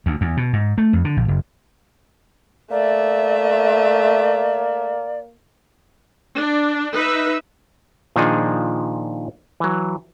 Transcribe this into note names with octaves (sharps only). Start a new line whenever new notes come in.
D2
E2
B2
G#2
A3
F2
D3
A#1
F#1
A3 A#3 D5 E5
D4
D#4 B4 E5
A#2 D#3 F3 D4 D#4 G#4
E3 F#3